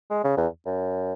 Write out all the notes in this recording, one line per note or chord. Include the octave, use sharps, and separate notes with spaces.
G#3
C#3
E2
F#2